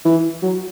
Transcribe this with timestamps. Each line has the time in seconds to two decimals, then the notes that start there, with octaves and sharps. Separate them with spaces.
0.05 E3
0.43 F#3